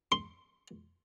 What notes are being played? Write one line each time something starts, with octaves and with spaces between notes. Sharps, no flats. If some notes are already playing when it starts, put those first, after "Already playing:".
C6